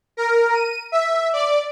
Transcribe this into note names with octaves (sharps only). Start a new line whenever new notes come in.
A#4
D#7
E5
D5